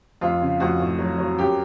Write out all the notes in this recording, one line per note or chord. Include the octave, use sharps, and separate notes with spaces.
F2 F4
C#3
F2 F#4
A2
F#3
F#3
F#2 G4